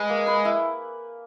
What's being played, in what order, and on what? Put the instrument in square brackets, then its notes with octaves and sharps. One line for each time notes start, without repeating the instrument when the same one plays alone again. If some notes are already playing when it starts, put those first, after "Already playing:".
Already playing: [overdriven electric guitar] G#3 [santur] G#4 B4
[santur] A#3
B4
E4